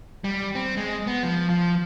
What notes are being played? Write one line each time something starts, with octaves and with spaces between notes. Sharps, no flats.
G3
C4
G#3
B3
F3
F3